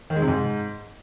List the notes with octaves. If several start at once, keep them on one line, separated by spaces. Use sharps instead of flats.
D#3
G#3
C3
G#2